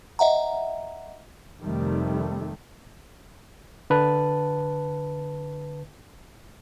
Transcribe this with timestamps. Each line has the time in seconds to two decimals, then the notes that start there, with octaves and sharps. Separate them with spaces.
0.19 D#5 E5 F#5 A#5
1.61 F2 C3 D#3 G3 A3
3.90 D3 B4 A5